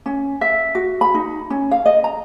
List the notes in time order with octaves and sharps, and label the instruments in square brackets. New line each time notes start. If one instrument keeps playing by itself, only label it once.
[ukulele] C#4
E5
F#4
B5
D#4
C#4
F5
D#5
A#5